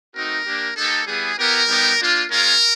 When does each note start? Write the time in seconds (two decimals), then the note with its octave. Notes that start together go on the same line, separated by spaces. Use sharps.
0.15 A3 C4 D#4 F#4 A#4
0.45 A#3 D4 G4
0.76 A#3 D#4 G4 A4
1.07 G3 B3 E4 G#4
1.38 B3 E4 G4 A#4
1.68 G3 B3 D#4 G4
1.99 A#3 D4 F4
2.30 G#3 C#4 F4 A#4